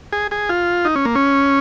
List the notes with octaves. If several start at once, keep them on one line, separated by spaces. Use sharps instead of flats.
G#4
G#4
F4
D#4
C#4
A#3
C#4